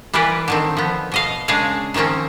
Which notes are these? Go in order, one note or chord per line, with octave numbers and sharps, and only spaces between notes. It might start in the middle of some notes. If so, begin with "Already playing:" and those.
E3 G3 F4 A#4 B4
D3 D#3 C4
F3 B3
B2 D#5 F5
C#3 G#3 D4 G#4 F5
D#3 F3 A#3 C4 C#4